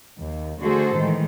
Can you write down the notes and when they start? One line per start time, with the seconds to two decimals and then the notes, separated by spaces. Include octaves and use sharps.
0.19 D#2
0.62 D3 A3 F#4 G#4 A4 C5
0.97 A2 D#3 E3 G#3